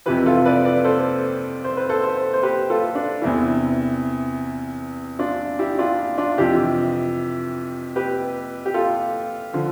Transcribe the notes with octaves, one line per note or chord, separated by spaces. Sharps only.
F2 C3 E3 G4 B4
F4 A4
B4 D5
B4 D5
A4 C5
C5
B4
A4 C5
A4 C5
C5
G4 B4
F4 A4
D4
E2 C3 E3 E4
D4 F4
E4 G4
D4 F4
D4 F4
F2 C3 E3 E4 G4
G4 B4
G4
F4 A4
D3 F3